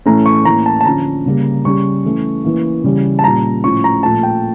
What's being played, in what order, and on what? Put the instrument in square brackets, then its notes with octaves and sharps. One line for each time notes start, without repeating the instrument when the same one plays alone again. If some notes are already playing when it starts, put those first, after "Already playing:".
[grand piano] A2 E3 A3 C#4 A#5
C#6
A2 E3 A#3 C#4 A#5
A5
A5
D3 F3 C#4 A#5
C#3 G3 A#3
C#3 G3 C#4 C#6
E3 A3 C#4
E3 A#3 C#4
C#3 E3 G3 C#4
A5
A#2 G3 C#4 A#5
A2 F3 C#4 C#6
A#5
A#2 F3 A3 A5
G5